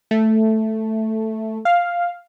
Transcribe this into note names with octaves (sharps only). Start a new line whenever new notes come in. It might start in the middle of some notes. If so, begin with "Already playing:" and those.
A3
F5